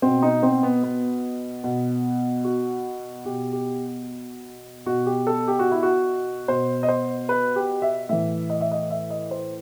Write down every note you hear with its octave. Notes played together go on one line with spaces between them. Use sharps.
B2 C4
D#4
C4
B3
B3
B2
F#4
B2 G4
G4
B2 F#4
G4
A4
G4
F#4
E4
F#4
B2 C5
D#5
C5
B4
G4
E5
A2 E3 E5
D#5
E5
D#5
E5
D#5
C5